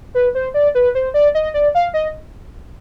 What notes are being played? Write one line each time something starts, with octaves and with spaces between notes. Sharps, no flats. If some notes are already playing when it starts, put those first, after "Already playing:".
B4
C5
D5
B4
C5
D5
D#5
D5
F5
D#5